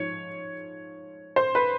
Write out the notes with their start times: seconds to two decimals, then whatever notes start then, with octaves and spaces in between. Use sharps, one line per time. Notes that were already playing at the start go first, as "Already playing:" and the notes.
Already playing: G#2 F3 C#5
1.36 C5
1.55 B4